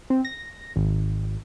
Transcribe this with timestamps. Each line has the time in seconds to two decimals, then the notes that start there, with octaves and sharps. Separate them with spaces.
0.10 C4
0.25 A#6
0.76 G#1